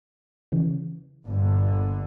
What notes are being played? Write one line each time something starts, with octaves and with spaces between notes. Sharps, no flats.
C#3 E3
G1 A#2 D3